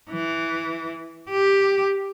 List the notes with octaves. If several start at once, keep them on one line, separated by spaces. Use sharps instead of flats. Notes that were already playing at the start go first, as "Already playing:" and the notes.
E3
G4